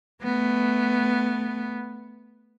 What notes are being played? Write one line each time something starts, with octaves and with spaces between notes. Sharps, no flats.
A3 B3